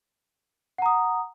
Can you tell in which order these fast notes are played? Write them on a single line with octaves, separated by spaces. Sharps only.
F#5 A#5 D#6